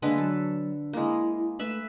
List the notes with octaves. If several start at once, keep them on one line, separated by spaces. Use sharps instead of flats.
D3 G#3 A#3 B4
F#3 A4
G#3 A#3 E4
A3 B4 E5 B5